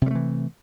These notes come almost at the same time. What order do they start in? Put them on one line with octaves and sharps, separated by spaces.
C3 G3 A3 E3